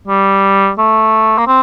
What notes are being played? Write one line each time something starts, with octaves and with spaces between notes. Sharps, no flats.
G3
A3
A#3
C4